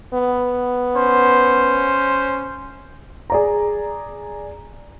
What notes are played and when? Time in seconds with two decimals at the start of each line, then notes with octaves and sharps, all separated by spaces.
0.14 B3
0.94 C#4 C5
3.30 G#4 D5 A#5